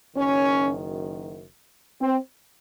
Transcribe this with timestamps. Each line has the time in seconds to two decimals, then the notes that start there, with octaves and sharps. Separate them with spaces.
0.16 F#1 F#2 D#3 C#4
2.01 C4